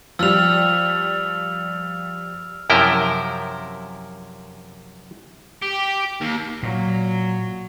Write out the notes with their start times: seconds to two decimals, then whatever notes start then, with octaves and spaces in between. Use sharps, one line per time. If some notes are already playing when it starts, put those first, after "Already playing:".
0.19 F3 G3 E6 F6 F7
2.70 F#2 C3 F3 E4 A#4 G5
5.62 G4
6.21 D#2
6.63 A#2 F#3